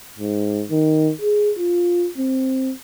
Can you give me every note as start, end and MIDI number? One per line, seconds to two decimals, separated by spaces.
0.19 0.64 44
0.71 1.12 51
1.22 1.52 68
1.58 2.08 65
2.18 2.73 60